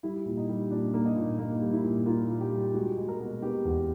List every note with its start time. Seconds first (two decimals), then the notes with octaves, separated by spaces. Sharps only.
0.03 G3 E4
0.25 A#2
0.37 D#4
0.49 G3
0.71 A#2 D4
0.94 A#3
1.06 D#4
1.17 A#2
1.39 A#3 D#4
1.62 G3
1.73 E4
1.84 A#2
2.06 A#3 F4
2.30 A#2
2.40 G4
2.52 G3
2.74 G#3 F#4
2.97 G#3
3.08 A#4
3.19 B2
3.42 B3 G4
3.65 E2